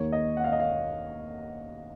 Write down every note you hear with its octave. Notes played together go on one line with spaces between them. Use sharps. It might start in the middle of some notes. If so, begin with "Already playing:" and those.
Already playing: D#2 D#3 A#3 C#5
D#5
F#5
F5
D#5
F5